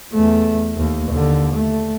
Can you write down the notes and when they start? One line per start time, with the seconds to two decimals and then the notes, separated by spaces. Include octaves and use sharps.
0.12 E2 A3
0.77 D#2
1.10 D#2 D3
1.54 A3